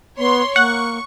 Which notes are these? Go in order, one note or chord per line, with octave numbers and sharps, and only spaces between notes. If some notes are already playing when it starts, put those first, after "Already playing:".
B3 C#5 C6
A#3 F#5 C#6